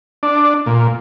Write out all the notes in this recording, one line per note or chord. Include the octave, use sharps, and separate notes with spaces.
D4
A#2